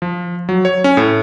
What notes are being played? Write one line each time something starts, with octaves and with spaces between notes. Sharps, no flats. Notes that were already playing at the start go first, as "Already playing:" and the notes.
F3
F#3
C#5
C#4
A2